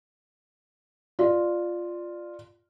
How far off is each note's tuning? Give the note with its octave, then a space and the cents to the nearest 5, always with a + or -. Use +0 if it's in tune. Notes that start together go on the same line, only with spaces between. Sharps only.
F4 +0 D5 +15